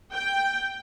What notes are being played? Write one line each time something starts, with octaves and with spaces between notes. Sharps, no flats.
G5